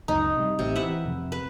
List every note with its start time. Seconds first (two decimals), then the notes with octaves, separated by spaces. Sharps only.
0.08 C#2 F#2 D#4
0.37 C3 G3
0.59 A1 C3
0.76 E3 B4 E5 F#5
1.05 F2 C3
1.32 B4